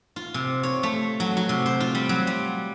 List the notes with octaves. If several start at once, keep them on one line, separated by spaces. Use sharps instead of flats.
F4
C3
C#5
A3
F#3
F#3
C3
C5
F4
G3
F#3
G3